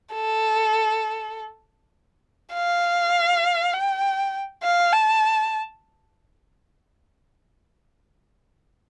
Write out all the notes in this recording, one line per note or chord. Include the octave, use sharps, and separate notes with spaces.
A4
F5
G5
F5
A5